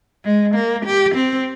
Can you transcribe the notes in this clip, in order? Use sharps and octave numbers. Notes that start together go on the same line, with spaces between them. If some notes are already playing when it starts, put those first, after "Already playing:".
G#3
A#3
G4
C4